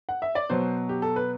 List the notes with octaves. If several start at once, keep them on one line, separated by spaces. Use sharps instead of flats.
F#5
E5
D5
B2 F#3 C5
G4
A4
B4